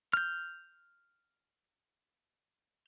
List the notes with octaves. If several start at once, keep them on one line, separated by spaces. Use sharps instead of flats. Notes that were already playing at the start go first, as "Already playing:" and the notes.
F6 G6